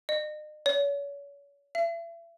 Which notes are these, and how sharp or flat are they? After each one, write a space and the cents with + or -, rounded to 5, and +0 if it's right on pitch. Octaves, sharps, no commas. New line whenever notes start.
D#5 -45
C#5 +35
E5 +35